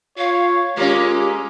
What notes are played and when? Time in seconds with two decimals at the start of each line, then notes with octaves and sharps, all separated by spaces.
0.18 F4 C#5 F5
0.77 G#3 A#3 C#4 F4 G4